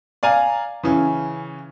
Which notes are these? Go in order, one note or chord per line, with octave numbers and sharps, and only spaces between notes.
D5 F5 G#5 A#5
C#3 E3 C#4